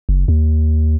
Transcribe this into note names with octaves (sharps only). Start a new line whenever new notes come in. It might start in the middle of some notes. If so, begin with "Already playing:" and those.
F#1
D#2